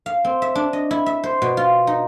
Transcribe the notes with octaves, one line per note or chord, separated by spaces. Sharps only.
F5
C4
E5
D4
D#5
E4
E5
C5
B2
F4
D#4